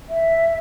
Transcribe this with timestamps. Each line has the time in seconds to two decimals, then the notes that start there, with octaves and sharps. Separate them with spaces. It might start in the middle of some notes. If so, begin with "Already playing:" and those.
0.09 E5